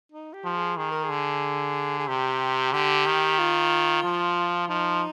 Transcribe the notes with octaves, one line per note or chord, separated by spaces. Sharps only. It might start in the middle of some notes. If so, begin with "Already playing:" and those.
D#4
G4
F3
G#4
D#3 G#4
A#4
G#4
D3
G#4
C3 G4
D3 G4
D#3
F4
F3
F3 D#4